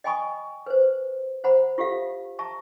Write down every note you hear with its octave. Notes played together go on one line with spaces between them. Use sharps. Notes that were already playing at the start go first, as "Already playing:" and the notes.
D#5 G5 G#5 B5 C#6 D#6
B4 C5
C5 F#5 A#5 B5
F4 G4 A4 E5 F5
E5 A5 A#5 C#6